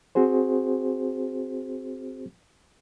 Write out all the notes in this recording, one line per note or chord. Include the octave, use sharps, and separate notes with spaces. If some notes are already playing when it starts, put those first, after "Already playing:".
C4 F#4 G#4 C5